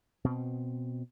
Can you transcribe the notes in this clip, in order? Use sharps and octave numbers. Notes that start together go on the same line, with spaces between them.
B2 C4